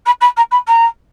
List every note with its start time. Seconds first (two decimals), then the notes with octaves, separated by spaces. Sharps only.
0.06 B5
0.21 B5
0.36 A#5
0.51 B5
0.67 A#5